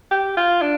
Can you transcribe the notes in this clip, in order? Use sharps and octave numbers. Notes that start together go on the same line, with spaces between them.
G4
F4
D4